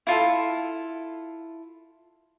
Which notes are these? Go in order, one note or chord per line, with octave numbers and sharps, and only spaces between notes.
E4 F4 A4